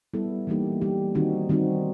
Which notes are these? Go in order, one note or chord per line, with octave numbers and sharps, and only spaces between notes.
G3 B3 E4 A4
E3 G3 A#3 D#4 G4
E3 G3 A#3 D#4 G4
D#3 G3 C4 D#4 F#4
D#3 G3 C4 D#4 F#4